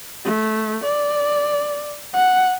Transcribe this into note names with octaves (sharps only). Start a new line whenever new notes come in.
A3
D5
F#5